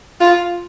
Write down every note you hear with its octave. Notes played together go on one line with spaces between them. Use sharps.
F4